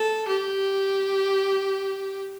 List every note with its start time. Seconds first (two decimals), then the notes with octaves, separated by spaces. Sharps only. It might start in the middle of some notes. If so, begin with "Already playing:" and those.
Already playing: A4
0.28 G4